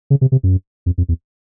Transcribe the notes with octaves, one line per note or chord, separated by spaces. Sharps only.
C#3
C3
C3
F#2
F2
F2
E2